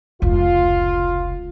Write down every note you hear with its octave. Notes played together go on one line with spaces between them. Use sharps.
F1 C#2 F4